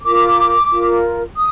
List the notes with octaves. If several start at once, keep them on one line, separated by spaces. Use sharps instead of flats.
F4 A#4 D6
F4 A#4
D#6